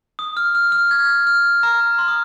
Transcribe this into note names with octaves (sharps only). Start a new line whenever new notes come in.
D#6
F6
F6
F6
G#6
F6
A#5
C6
D#6